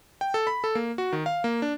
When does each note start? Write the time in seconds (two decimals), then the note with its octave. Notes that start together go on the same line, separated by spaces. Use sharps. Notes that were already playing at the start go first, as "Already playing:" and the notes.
0.21 G5
0.34 A4
0.47 B5
0.64 A4
0.75 A#3
0.98 F#4
1.12 D#3
1.26 F5
1.44 A#3
1.62 D4